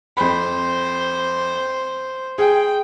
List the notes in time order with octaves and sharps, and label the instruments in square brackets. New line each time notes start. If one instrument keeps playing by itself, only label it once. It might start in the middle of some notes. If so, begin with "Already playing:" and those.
[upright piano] F2 B5 [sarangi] C5
[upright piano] G#4 [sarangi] G5